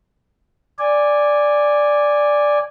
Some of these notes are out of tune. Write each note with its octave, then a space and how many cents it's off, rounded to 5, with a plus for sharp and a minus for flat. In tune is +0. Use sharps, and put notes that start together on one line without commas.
D5 +0 G#5 -15